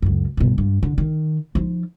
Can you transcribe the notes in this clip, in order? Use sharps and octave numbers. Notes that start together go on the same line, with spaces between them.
C#2 F#2
G2 B2
G2
D3
D#3
F3 D#4